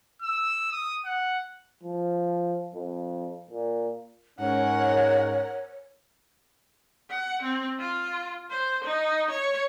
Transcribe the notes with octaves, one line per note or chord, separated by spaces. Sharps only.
E6
D#6
F#5
F3
F2
A#2
G#2 C#4 A#4 C#5 F#5
F#5
C4
F4
C5
D#4
C#5